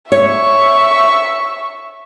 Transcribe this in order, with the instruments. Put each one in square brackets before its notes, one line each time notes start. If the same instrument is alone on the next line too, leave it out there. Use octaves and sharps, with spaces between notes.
[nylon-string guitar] C#5 [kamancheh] E5 C#6